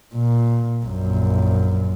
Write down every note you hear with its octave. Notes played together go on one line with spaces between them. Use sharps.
A#2
A#1 F#2